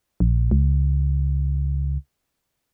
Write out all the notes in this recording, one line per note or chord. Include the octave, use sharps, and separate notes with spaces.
A#1
C#2